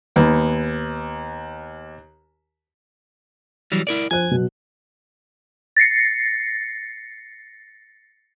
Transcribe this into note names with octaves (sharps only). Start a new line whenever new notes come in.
D#2 B3
E3 F#3 G3
E4 A#4 D5
F3 C5 G#5 F#6
B2 F#3
A6 A#6 C7 C#7